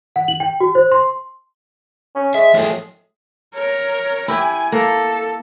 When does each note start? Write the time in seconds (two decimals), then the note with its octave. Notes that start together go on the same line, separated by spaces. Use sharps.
0.16 F#5
0.28 F#7
0.40 G5
0.60 F#4
0.75 C5
0.92 C6
2.15 C#4
2.34 G#3 E5
2.54 A2 F3 A3 G#4
3.54 A#4 C#5
4.28 E4 G4 G#5
4.72 A#3 A4